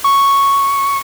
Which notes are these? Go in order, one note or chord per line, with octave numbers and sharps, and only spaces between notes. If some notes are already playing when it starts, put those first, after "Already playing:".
C#6